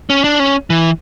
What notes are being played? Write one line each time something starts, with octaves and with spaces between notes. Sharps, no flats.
C#4
D4
C#4
E3